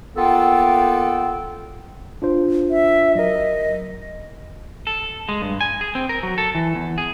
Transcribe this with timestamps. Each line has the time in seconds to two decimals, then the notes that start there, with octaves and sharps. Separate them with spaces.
0.17 A#3 B3 F4 A4 G5
2.22 D4 F4 C5
2.70 E5
3.15 F#3 A#4 D#5
4.87 A4
5.29 G#3
5.42 G2
5.61 G#5
5.81 G#4
5.95 C4
6.09 A#4
6.23 F#3
6.38 A4
6.55 E3
6.75 E2
6.98 G#4